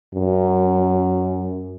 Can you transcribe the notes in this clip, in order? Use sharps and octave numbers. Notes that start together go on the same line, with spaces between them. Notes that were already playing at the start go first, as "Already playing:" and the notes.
F#2